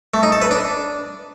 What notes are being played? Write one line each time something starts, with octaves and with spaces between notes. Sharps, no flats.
A3
D#4
A4
B4
D4